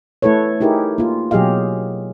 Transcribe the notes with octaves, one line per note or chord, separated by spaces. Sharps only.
A3 E4 A4 B4 C#5
D#4 E4 G4 G#4 A#4
A#3 F4
B2 F#3 G4 G#4 D#5 F5